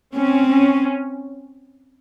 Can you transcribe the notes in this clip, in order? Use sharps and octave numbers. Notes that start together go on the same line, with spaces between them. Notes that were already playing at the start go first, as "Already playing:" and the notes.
C4 C#4
C#4